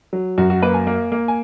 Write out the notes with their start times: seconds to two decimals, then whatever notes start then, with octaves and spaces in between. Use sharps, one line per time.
0.13 F#3
0.38 F#2 F#4
0.50 F#4
0.62 A#3 B4
0.74 G#5
0.87 A#3
1.12 A#3
1.28 G#5